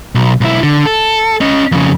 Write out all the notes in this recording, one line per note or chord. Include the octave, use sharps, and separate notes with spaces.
B1
B1 E4
D3
A4
C#4 D#5
F2 C#3